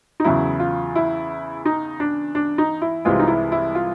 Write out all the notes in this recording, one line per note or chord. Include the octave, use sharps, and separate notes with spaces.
D#4
E2 C#3 F#3 E4
F4
E4
D#4
D4
D4
D#4
E4
C2 C3 E3 G#3 F4
D#4
E4
E4
F4